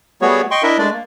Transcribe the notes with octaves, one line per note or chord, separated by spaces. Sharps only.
G3 A3 B3 F#4 G#4 C#5
D#5 G5 C6 C#6
D4 E4 A#4 D#5 E5
G#3 A3 D4 D5
A#3